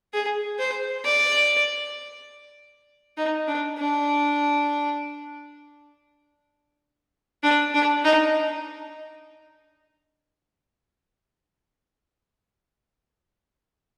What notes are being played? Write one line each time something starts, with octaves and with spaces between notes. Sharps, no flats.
G#4
C5
D5
D#4
D4
D4
D4
D4
D#4